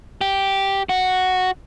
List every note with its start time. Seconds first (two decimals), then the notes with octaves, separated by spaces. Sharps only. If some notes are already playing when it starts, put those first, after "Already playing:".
0.21 G4
0.89 F#4